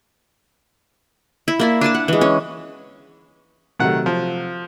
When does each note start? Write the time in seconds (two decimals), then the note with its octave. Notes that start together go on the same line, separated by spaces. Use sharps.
1.48 E4
1.59 A#3 E4 D5
1.81 D4 G#5 A5 D6
1.94 F#5
2.08 E3 G#3
2.21 C#4
3.79 C3 D#3 F#3 A3 F#5
4.06 F3